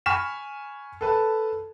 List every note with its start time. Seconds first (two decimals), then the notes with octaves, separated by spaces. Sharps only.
0.06 G#5 B5 C#6 F6 B6 E7
1.01 A4 B4 A5